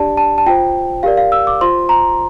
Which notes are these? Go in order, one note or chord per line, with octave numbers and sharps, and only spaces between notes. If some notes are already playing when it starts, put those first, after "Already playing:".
Already playing: D4 G4 D5 A5
A5
A5
F4 C5 G5
G4 A#4 D5 F5
F5
E6
D6
F4 C5 C6
A#5